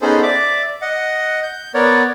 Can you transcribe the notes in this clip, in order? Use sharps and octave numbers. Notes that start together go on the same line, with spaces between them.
B3 C#4 D#4 G#4 A4 C5
D5 E5 D6
D#5 F#5
G6
B3 A#4 C#5 D5